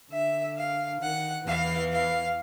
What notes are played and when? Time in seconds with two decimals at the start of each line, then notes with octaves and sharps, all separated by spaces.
0.11 D3 E5
0.56 F5
1.01 D#3 F#5
1.46 E2 E3 F5
1.91 F5